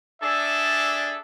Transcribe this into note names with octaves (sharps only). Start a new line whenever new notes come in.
D4 G#4 A4 D5 E5